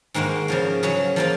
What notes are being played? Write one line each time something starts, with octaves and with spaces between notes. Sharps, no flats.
G#2 D#3 A#3 D#4 F#4
C#3 F3 A#3
C#3 F#3 C#4 F#4
F3 A#3 F4